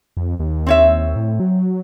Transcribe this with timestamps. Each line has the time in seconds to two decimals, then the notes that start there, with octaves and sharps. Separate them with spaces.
0.17 F2
0.40 D#2
0.67 C4 C#5 E5
1.16 A2
1.40 F#3